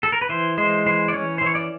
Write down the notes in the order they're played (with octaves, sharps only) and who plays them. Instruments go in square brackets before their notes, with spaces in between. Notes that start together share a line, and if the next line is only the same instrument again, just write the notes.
[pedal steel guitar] A4
A#4
B4
E3 C5
G#3 C5
E3 C5
D5
C#4 C#5
E3 C5
C#5
D5